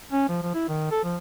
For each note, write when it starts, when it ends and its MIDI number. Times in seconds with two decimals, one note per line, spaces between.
0.12 0.29 61
0.29 0.39 53
0.42 0.52 53
0.54 0.65 64
0.68 0.89 51
0.91 1.00 69
1.04 1.16 53